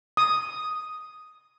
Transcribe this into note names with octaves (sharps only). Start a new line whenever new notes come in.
D#6